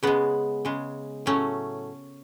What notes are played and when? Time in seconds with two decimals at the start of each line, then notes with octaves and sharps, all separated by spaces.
0.03 C#3 G#3 B3
0.65 C#3 G#3
1.26 A2 F#3 A3 C#4